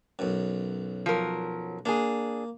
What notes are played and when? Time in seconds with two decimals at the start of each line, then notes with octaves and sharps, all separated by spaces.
0.19 B1 F#2
1.06 F3 F#3 A#4
1.86 A#3 D4 G#4